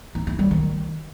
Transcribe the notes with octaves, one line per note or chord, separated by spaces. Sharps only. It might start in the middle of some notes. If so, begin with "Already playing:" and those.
D#4
E4
G3
D#3